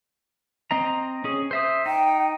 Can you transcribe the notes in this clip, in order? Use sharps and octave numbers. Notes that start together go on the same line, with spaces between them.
C4 D#5 A#5
C#4 G#4
C5 E5 D#6
D#4 G5